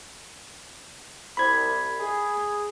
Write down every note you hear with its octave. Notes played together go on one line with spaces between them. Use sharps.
C2 B5 G#6
G#4